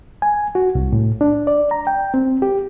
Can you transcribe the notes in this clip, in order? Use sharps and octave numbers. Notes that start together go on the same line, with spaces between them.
G#5
F#4
C2
A2
D4
D5
A#5
G5
C4
G4